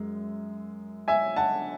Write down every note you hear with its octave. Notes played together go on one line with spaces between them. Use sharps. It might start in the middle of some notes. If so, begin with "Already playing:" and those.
Already playing: F#2 G#3
E5 G#5
F#5 A5